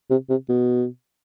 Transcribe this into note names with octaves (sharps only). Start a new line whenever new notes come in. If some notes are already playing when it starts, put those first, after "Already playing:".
C3
C3
B2